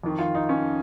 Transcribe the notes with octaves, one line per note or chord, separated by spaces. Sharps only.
F2 D#3
F4
D#4
C#4